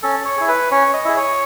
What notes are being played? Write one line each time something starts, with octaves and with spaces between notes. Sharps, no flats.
C#4 A4
C#5
E4 G#4
B4
C#4 C#5
D#5
E4 G#4
C#5